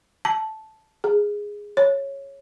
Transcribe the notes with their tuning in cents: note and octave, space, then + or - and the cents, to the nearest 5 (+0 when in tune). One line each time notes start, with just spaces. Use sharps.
A5 -10
G#4 -5
C#5 -10